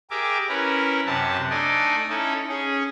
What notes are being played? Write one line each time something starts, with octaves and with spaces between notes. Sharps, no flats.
G4 G#4 A#4 E5 D6
C#4 E4 A#4 B4
F#2 C3 F#5 A5
A3 D4 D#4 D5 D#5 G#5
C#4 D#4 E4 A4
C#4 G#4